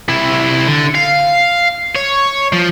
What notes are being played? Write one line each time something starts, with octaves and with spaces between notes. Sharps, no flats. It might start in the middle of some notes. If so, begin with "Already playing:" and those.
C3 E4
D3
F5
C#5
F3